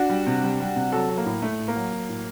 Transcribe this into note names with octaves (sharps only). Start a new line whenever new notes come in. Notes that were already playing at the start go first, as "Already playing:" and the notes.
Already playing: D4 F#4
G3
C3
G3
G3
C3
F#3 F#4 A4
F#3
A#3
A2
A2 A3
A2
A#3
F#3
F#3
A2